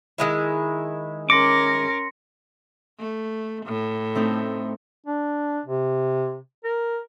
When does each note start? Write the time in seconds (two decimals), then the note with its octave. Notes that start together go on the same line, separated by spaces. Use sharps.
0.18 D#3 G#3 E4
1.30 C#4 A#4 C6 D6 A#6 C#7
2.99 A3
3.66 A2
4.15 A3 C4 D#4
5.06 D4
5.65 C3
6.64 A#4